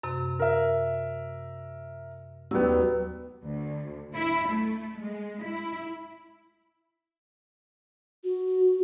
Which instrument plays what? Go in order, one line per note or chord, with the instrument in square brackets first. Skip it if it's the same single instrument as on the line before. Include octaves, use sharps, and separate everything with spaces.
[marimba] F#2 C3
[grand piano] A#4 E5
[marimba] D#2 E6 [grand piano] F#3 G3 B3
[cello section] D2
E4
A3
G#3
E4
[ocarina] F#4